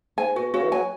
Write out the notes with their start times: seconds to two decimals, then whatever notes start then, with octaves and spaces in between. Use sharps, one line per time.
0.17 G#2 G#5
0.36 B2 F#4
0.54 C#3 F#4
0.63 E3
0.72 F#3 G#5